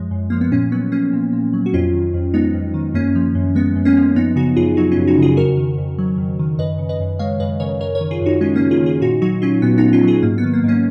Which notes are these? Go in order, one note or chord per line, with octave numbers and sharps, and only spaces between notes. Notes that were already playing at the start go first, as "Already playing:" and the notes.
Already playing: F#2 F3 G#3
F#2
F3 A#3
B3
A#2 A#3 C#4
F#3 B3
F#3 A#3 C#4
A#2
A#2
F#3
F#4
F2 C#4 F4
D#3
F2
G#3 B3 D#4
F2
D#3
F#2 A#3 C#4
F3
F#2
G#3 B3
F#2
A#3 C#4
F3
F#2 B3 D#4
C#3 D#4 F#4
F#2 F4 G#4
F#3 D#4 F#4
C#4 F4
F#2
D#4 F#4
C#3 F4 G#4
F2 F#4 A#4
D#3
F2
F#3
F2
D#3
F#2 B4 D#5
C#3
B4 D#5
F#2
G#3 C#5 F5
F#2 B4 D#5
C#3 A#4 C#5
F#2 A#4 C#5
A#4 C#5
D#3
F4 G#4
F#2 D#4 F#4
G#3 C#4 F4
A#3 C#4
F#2
F4 G#4
D#3
F4 G#4
A#2 D#4 F#4
F#3 D#4 F#4
F#3 C#4 F4
A#2 B3
A#2 B3 D#4
C#4 F4
F#3 F4 G#4
G#2 A#3
B3
D#3
A#3
G#2 A#3 C#4